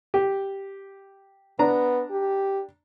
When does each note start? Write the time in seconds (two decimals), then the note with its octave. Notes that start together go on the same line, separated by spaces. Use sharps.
0.14 G4
1.59 B3 D4 A#5
2.11 G4